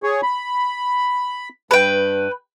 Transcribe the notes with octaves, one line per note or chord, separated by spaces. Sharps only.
G#4 C#5
B5
G2 B4 G5